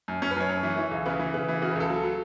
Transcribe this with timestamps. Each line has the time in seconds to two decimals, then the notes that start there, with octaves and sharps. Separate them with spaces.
0.08 F#2
0.22 F#2 C#4
0.31 B4
0.36 F#2 C#5
0.49 F#2
0.63 E3
0.77 E3
0.91 C#2
1.06 C#3 B4
1.19 E3
1.34 C#3 B4
1.48 E3
1.62 C#3 F#4
1.71 B4
1.76 C#2 A4
1.90 F#3
2.03 F#3